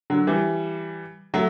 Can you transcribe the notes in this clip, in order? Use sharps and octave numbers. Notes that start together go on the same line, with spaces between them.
D3 F#3
E3 G3
F#3 A3